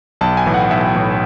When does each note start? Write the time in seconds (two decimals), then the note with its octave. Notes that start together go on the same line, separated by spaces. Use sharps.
0.21 B1 A5
0.37 G#5
0.46 A2 E3
0.54 F#5
0.71 B1 E5
0.96 A2 E3